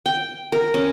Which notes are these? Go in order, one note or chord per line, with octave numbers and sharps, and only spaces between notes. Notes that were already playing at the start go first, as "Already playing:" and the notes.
G5
A#4
C#4